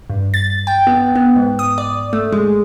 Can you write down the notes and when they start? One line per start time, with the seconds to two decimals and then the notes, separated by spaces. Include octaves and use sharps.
0.10 G2
0.34 A6
0.67 G5
0.87 B3
1.16 B3
1.36 G#2
1.59 D#6
1.78 D5
2.13 A3
2.32 G#3